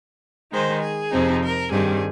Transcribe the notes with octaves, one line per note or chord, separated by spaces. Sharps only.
D#3 G#3 D#4 C5
G#4
F2 C3 F3 C4 D#4
A#4
G2 D#3 G3 C4 G#4